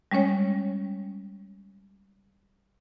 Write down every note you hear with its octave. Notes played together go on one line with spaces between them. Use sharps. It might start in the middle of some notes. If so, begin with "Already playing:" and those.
G3 G#3 C#4 C#5 G5